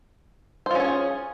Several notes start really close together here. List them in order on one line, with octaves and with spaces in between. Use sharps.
C5 F4 C#4 C#5 G#4